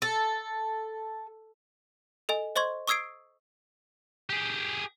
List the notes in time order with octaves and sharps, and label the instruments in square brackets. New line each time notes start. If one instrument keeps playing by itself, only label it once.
[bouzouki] A4
[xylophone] A4 D#5 G#5
C5 D#5 C6 C#6 G#6
C#6 D#6 E6 G#6 C7 D7
[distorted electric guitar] G4 G#4